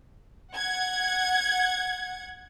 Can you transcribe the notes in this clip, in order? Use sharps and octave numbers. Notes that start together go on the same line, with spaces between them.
F#5 G#6